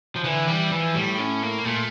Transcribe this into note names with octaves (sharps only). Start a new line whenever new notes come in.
F3
D3 E3
E3 G3
E3 F3
A2 G3
C#4
A#3
A#2 A3